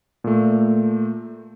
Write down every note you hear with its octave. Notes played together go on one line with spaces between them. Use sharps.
A#2 A3